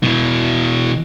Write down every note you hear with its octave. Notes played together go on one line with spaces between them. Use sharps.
B2 E3